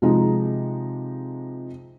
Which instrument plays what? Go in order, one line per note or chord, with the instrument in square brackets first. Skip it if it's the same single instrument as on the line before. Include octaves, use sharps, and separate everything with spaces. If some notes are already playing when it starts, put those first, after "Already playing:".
[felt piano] C3 F3 G#3 D#4